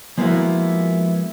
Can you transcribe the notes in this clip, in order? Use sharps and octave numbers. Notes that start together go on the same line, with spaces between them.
F3 G#3 A#3 B3 E4 F#4